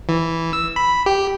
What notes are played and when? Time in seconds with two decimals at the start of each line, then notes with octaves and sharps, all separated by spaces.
0.09 E3
0.53 E6
0.76 B5
1.06 G4